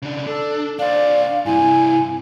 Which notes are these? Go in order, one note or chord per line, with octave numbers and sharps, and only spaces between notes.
C#3 D4
D4 A4
D4 C5 D5 F5
G2 C3 E4 G#5